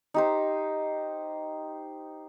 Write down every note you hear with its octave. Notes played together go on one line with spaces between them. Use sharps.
D#4 G4 C5